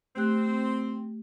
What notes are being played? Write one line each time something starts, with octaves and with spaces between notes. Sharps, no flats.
A3 C4 G4 F#6